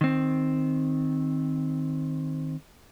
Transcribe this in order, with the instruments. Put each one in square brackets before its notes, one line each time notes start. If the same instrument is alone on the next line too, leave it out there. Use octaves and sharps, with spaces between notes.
[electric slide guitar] D#3 C4